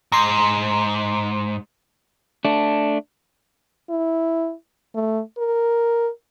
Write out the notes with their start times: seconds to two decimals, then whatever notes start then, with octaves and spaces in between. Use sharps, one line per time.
0.12 G#2 A#5 C6
2.45 A3 D4
3.90 E4
4.95 A3
5.38 A#4